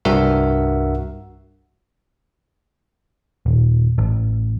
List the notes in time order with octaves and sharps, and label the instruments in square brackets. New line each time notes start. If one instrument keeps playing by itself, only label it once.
[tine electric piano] C2 G2 F#4 A#4 E5 F#5
[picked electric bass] D#1
A1